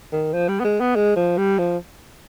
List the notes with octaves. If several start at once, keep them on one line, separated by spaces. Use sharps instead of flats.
D#3
F3
G3
B3
G#3
B3
G#3
F3
G3
F3